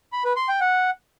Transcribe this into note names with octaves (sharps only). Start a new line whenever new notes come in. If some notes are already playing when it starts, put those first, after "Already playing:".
B5
B4
C6
G5
F#5